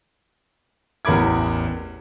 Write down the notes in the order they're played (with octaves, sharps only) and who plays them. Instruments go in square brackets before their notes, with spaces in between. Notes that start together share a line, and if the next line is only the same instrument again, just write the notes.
[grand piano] A1 E2 A#4 B5 D6 G#6